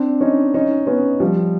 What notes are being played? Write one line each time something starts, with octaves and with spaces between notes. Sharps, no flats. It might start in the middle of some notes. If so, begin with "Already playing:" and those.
Already playing: C4 D4
C#4 D#4
C#4 D#4
B3 C#4
F3 G3